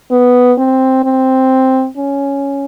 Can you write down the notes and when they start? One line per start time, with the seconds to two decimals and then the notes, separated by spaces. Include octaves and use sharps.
0.11 B3
0.58 C4
1.04 C4
1.97 C#4